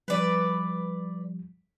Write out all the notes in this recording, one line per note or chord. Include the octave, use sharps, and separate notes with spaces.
F3 G3 B4 D5